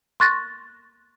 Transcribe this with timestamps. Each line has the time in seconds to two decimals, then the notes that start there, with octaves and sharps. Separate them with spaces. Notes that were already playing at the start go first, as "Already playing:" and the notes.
0.20 C6 C#6 F#6 A6 A#6